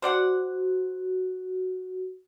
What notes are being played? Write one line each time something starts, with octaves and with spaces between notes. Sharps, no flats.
F#4 C5 D5 F#5